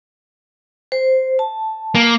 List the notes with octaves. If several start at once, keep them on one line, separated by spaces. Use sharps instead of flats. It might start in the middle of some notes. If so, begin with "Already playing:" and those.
C5
A5
A#3